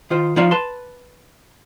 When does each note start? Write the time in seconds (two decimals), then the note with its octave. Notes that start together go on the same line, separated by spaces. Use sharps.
0.10 D#3 F4 C5
0.36 F3 D#4 F4 D5 F5
0.51 B4 A5 C6